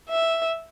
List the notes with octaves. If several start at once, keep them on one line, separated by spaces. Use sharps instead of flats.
E5